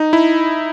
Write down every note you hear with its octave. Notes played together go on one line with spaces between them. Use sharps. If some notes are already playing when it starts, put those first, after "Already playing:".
Already playing: D#4
E4